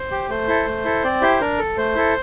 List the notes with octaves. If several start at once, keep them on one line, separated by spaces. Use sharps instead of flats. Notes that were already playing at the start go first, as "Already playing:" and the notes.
Already playing: C5
G4
A3 C5
E4 A4
A3
E4 A4
C4 D5
E4 G4 C5
D4 A#4
A4
A3 C5
E4 A4